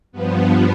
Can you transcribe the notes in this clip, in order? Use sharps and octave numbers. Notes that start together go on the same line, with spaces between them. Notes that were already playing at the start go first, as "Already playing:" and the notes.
G2 F3 B3